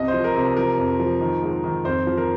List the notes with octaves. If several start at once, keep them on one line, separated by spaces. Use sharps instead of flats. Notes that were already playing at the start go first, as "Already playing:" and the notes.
Already playing: C2 C3 D#5
C5
F3
A#4
C3
F3 A#4
F2
F3
D#3
G#2
D#3
F2 C5
F3
A#4